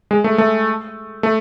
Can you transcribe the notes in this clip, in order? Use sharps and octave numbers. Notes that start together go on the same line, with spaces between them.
G#3
A3
A3
A3